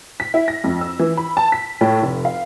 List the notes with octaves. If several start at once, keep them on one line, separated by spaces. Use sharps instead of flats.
B6
E4
A#6
F2
E6
E3
B5
A5
B6
A2
F1
F5